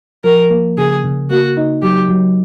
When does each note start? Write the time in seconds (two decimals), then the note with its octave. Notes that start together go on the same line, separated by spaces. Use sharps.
0.24 F3 A#4
0.50 A#3
0.78 C#3 G#4
1.04 C#3
1.30 A#3 F#4
1.57 D#4
1.82 F#3 G4
2.09 F#3